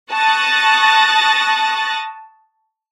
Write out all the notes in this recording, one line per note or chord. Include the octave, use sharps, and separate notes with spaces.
A5 C#6 D#6 F#6 A6 A#6